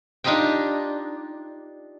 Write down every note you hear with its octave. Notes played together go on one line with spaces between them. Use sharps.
D4 D#4 F4 G4 D#5 G5